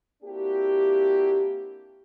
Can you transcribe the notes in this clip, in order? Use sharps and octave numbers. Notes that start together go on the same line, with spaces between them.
A#3 C4 D4 E4 F#4 G4